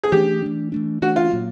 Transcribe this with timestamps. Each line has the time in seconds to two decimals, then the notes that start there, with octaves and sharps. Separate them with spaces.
0.03 G#4
0.12 E3 A3 D4 G4
0.42 E3 A3 D4
0.72 E3 A3 D4
1.02 E3 A3 D4 F#4
1.16 F4
1.31 A#2 F#3 A#3